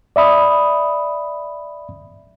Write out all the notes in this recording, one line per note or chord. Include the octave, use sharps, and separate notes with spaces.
D5 E5 B5 D#6